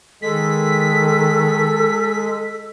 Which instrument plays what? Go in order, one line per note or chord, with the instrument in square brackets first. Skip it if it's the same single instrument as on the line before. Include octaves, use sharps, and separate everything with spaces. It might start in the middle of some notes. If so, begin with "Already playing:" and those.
[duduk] D#3 [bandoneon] G#3 [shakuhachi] A4 [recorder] B6